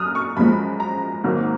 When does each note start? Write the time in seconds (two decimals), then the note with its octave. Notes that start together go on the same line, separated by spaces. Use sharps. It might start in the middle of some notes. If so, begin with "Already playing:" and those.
Already playing: F#2 D#6 F6 F#6
0.15 C#6
0.37 F#2 F3 G#3 B5
0.80 A#5
1.24 G#1 G#2 F#3 A#3